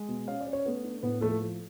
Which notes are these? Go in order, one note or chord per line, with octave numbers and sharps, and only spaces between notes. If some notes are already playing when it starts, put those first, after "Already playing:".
Already playing: G#3
B2
C#4 F5
D5
C#4
C#5
A3 B3 B4
D4
A2 B3 B4
F3 A3 A4
F3